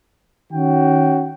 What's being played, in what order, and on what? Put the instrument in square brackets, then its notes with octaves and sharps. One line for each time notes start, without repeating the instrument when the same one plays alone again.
[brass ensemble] D#3 C#4 F#4 G5